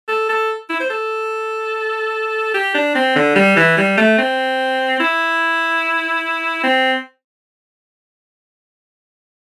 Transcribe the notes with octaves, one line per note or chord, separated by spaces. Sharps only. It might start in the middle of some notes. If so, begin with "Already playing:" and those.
A4
A4
E4
C5
A4
G4
D4
C4
D3
G3
E3
G3
A3
C4
E4
C4